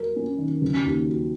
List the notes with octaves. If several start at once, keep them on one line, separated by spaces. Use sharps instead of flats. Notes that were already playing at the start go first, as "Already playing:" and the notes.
Already playing: F#3 A#4
C#4
D#3
C#3
D#2
F#3